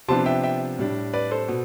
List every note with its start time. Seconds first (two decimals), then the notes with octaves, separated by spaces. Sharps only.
0.08 C3 F3 B3 D4 A5 C6
0.26 E5 G5
0.43 E5 G5
0.78 A2 G3 D4
1.13 B4 D5
1.31 A4 C5
1.48 B2